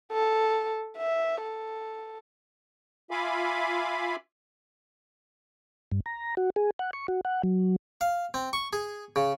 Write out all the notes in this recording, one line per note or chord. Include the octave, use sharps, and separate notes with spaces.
A4
E5
A4
F4 E5 F5 G#5 B5 D6
G2
A#5
F#4
G#4
F#5
C#6
F#4
F#5
F#3
F5
C4
C#6
G#4
C#3